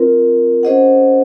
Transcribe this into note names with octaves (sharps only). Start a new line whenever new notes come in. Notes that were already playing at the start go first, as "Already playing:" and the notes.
Already playing: C4 F4 A#4
C#4 G#4 C5 D#5 F#5